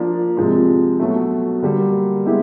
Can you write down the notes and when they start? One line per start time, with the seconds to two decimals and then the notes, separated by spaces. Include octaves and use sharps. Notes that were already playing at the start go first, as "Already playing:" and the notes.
Already playing: F3 A#3 D4
0.37 C3 F3 G#3
1.00 B2 F#3 A3
1.62 D3 G3 A#3
2.26 G#3 B3 E4 G4